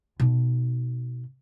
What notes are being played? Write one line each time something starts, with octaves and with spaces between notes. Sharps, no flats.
B2 D#4